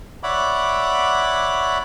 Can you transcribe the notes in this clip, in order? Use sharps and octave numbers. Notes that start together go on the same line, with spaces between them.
C#5 D5 E5 F#5 B5 D6